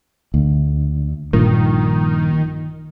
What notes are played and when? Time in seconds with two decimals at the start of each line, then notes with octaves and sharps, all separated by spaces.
0.34 D2
1.33 A#1 G2 A#2 D#3